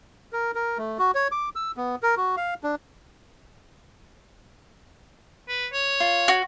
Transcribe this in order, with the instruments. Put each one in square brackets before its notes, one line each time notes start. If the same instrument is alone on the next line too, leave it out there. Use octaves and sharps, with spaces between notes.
[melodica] A#4
A#4
A3
F#4
C#5
D6
E6
B3
A#4
F#4
F5
D4
[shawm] B4
C#5
[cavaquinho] F4
[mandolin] F#4